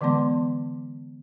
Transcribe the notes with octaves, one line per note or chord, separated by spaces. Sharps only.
D3 E3 G#3 B3 C6